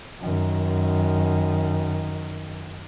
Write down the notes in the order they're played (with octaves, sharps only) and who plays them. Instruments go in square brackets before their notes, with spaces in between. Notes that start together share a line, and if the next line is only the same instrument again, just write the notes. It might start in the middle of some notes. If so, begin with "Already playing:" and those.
[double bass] F#2 D#3